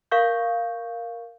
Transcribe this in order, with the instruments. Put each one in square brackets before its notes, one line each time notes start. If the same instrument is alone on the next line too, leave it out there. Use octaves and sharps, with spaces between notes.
[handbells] A#4 F5 C#6 G6